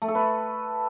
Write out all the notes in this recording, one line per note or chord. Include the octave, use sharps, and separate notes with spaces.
A3
A4
B4